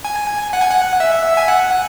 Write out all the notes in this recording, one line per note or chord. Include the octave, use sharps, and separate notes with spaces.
G#5
F#5
G#5
F#5
E5
G#5
F#5